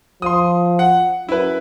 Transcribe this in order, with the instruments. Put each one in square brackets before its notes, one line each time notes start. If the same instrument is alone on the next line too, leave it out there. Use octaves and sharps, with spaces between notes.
[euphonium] F3 [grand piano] C6 D#6
[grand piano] F#5
[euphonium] F#2 [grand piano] E4 B4